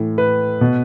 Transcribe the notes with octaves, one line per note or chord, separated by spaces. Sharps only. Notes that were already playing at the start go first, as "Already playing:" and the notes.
Already playing: A2 E3
B4
B2